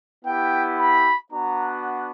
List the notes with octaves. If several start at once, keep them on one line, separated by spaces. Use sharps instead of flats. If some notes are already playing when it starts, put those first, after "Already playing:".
B3 E4 G4 G5
B5
B3 D4 F#4 A#5